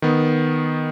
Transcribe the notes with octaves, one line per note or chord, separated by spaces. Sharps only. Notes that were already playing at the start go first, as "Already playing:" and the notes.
D#3 B3